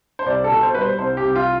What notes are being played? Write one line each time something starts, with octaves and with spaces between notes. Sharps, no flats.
C5
C2 D5
A4
B2
C5
G3 B4
C5
C2 C5
G4
C2
F4